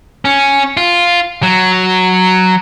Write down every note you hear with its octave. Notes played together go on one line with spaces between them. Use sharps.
C#4
F4
F#3